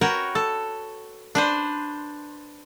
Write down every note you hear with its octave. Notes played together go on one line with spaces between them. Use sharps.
F#4 A#4 B4 C#5 G5
A4
D4 B4 C5